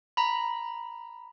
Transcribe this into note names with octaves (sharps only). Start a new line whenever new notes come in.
A#5 B5